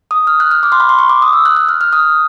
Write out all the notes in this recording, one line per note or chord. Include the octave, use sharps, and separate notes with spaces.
D#6
F6
F#6
F6
D6
C6
B5
C6
C#6
D6
D#6
E6
F#6
F#6
F6
F6
D#6